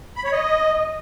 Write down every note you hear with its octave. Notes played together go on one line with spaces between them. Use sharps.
B5
C#5
D#5